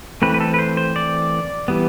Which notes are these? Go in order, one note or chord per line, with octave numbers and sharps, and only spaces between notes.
E3 A3 C4 B4
B4
A4
B4
C5
C5
D5
E3 G3 B3